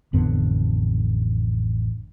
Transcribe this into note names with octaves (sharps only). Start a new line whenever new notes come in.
A1 F2 D3 B3